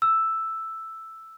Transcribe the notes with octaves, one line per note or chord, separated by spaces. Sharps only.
E6